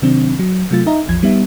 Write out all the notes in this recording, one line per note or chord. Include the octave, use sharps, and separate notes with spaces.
C3 D#3 F#3 C4 D4
F#3
C3 F#3 A3 F4 A6
D#4 D#5 E5 A#5
A1 E2 F3 G#6
G3 B3 D#4 E5